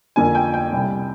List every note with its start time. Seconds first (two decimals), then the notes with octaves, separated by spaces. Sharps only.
0.16 F2 D3 F3 A#3 G#5
0.35 G5
0.54 G5
0.72 C2 C3 G3